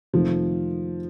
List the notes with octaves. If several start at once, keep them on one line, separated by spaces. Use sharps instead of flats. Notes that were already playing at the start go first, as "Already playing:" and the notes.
F2 C3 D#3 F3 A3